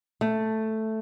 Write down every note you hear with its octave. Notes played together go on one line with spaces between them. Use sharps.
A3